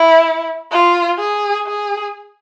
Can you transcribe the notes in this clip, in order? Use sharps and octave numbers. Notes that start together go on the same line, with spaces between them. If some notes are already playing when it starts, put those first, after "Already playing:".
Already playing: E4
F4
G#4
G#4